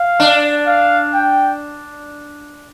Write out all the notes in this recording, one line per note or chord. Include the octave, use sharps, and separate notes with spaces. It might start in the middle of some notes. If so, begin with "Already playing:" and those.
Already playing: F5
D4
F5
G5